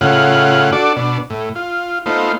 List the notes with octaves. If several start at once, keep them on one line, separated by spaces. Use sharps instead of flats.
A2 C#3 F4 F#5
D4 F#4 A4 D5
B2 D4
A2
F4
A3 B3 D#4 F4 C5